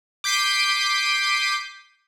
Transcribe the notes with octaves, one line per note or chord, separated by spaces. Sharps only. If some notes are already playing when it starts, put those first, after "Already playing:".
D6 G6 B6 C7 D7 D#7